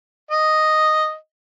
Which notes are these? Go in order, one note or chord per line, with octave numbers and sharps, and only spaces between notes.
D#5